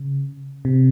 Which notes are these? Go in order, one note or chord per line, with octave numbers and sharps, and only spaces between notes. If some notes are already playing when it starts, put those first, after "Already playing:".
Already playing: C#3
C3